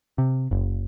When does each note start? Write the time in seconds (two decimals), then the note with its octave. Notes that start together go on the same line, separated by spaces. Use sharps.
0.18 C3
0.51 F#1